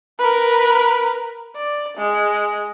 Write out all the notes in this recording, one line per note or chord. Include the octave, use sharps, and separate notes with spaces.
A#4 B4
D5
G#3